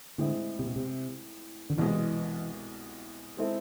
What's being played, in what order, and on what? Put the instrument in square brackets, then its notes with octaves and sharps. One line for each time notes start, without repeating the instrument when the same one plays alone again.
[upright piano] A2 G#3 C4 E4 [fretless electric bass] D3
[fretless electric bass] C3
B2
C3
D3
[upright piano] C2 B2 G#3 [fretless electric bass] E3
[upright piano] G#3 C4 E4 A4